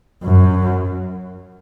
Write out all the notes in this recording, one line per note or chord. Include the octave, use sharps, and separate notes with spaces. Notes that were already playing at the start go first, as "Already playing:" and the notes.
F#2